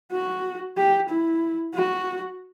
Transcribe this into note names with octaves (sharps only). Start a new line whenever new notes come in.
F#4
G4
E4
F#4